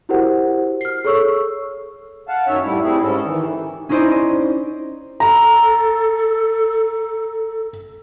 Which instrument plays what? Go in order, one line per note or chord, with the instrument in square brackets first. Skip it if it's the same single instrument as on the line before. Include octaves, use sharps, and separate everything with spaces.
[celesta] E4 F#4 G4 A#4 C5 F#5
F6 C7
G#4 A4 C#5 C#6 E6
[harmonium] F5 F#5 A5
F#2 D#3 C#4 C#5 E5
A2 E3 G3 A3 E4
G3 A3 C4 E4 G#4
G#2 G3 C#4 A4
D#3 E3
[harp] C#4 D#4 E4 C5 D5 D#5
[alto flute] A4 [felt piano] A#5